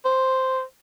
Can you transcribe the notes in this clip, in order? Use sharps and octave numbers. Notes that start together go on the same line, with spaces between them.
C5